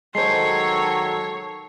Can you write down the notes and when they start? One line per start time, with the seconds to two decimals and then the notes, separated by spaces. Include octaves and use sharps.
0.15 D#3 F#3 G#3 A4 C5 C#5 C7